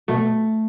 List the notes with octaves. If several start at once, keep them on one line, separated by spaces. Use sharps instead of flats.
B2 A3